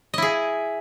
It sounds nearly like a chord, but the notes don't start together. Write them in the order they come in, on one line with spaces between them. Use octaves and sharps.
D#5 E4 G#4